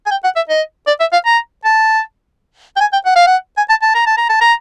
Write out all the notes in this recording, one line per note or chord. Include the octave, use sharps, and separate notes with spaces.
G#5
G5
F#5
E5
D#5
D5
E5
F5
A#5
A5
G5
G#5
G5
F#5
F5
F#5
G#5
A5
A5
A#5
A5
A#5
A5
A#5